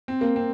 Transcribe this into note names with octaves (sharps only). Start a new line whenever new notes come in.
C4
A#3
C4